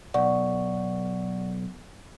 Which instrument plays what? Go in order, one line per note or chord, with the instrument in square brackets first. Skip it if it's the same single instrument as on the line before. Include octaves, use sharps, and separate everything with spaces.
[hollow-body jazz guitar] B1 [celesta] D5 F#5 C#6